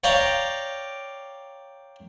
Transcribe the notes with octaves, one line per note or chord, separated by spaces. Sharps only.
C#5 D5 F5 G5 A#5 D6